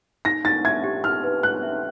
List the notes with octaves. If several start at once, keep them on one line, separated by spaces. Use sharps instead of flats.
D#4 A#6
D#4 A6
E5 G#6
G4
D#4 F6
B4
D#4 F#6
E5